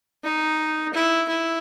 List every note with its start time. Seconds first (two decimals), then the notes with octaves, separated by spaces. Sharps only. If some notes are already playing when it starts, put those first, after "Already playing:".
0.24 D#4
0.94 E4
1.29 E4